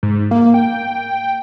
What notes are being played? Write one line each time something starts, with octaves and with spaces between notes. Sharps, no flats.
G#2
A#3
G5